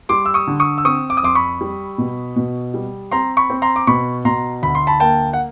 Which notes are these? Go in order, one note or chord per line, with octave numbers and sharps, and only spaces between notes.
G3 C6 D6
E6
C#6 D#6
D3
C#6 D#6
E6
C4 C#6 D#6
D6
D#6
F2 C6 D6
B5 C#6
G3
B2
B2
G3
C4 A#5 C6
B5 C#6
C4
A#5 C6
D6
B2 B5 C#6
B2 A#5 C6
D2 B5
C6
A5 B5
A#3 G5 A5
F#5